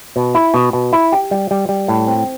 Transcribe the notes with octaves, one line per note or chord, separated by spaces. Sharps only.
B2
E4
B2
B2
E4
G4
G3
G3
G3
A2
C4